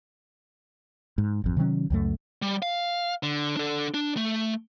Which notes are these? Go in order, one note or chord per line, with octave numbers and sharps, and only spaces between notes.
G#2
G#1 F2
C3 D#3 F#3 C#4
C#2 F#2 A3
G3
F5
D3
D4 A4
D4
A3